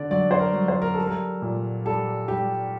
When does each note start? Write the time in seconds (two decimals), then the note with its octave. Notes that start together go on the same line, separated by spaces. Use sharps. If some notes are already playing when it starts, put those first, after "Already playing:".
Already playing: D3 D5
0.10 F#3 D5
0.31 C5
0.39 A#4
0.54 F#3
0.68 C5
0.82 A#4
0.94 G3 A4
1.07 A#4
1.42 A#2
1.85 G3 A4
2.28 G3 G4